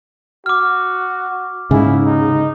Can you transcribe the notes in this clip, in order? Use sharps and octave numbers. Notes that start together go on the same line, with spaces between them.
F#4 D6 F6
D#2 G#2 C#3 E4 G#4
D#4